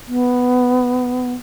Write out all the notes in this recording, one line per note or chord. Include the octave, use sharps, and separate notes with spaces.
B3